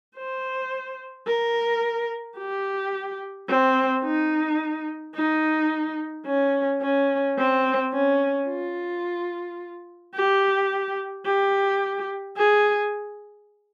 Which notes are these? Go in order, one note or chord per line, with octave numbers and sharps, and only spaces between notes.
C5
A#4
G4
C4
D#4
D#4
C#4
C#4
C4
C#4
F4
G4
G4
G#4